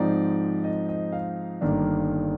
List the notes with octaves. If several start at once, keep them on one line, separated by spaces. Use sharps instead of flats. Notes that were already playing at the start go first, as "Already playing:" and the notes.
Already playing: G#2 F3 C4 D#4 D5
D#5
D#5
F5
G1 G2 D#3 A#3 D4